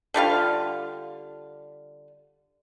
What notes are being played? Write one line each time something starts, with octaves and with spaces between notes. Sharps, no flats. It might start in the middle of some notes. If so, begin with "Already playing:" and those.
D3 G3 F4 F5